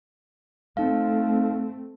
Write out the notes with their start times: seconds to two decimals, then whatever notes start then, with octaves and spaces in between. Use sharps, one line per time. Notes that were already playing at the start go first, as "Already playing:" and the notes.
0.77 A3 C4 D#4 F5